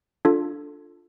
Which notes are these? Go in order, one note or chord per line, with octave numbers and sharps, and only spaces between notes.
D4 F4 A4